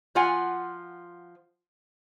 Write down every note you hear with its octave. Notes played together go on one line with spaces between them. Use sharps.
F3 F4 F#5 G#5